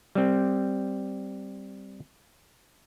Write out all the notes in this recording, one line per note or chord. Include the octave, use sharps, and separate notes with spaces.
G3 C4